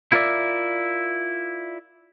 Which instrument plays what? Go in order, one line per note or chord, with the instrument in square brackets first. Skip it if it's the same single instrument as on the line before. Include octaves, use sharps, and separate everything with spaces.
[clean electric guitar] E4 F4 A#4 B4 D5 E5